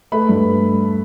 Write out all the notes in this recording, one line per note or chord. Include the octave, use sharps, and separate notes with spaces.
A3 B4 B5
G2